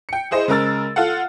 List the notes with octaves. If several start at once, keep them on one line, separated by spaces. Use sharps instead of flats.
G5 C#7
E4 G#4 C5 D#5
C#3 G#3 A#4 E6 A6
F4 A4 F5 F#5